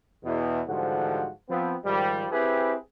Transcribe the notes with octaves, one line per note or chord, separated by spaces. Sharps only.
E2 B2
G#2 D3 E3 F3 G3 F#4
F3 B3 C4
G#2 D#3 F3 G3
C4 E4 G4 G#4 B4